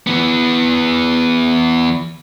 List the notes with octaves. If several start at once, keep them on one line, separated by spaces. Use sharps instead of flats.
E3 B3